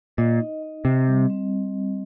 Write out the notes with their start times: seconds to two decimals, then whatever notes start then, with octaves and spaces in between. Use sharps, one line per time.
0.18 A#2 D#5
0.40 D#4
0.62 D#5
0.85 C3 C4
1.07 G3
1.30 C4